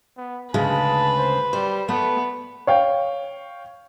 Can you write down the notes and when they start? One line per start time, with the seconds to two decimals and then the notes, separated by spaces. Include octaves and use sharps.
0.17 B3
0.54 D2 C#3 G#3 B4 A5
1.18 C5
1.53 G3 C5
1.89 A3 B3 B4
2.67 C#5 F5 G5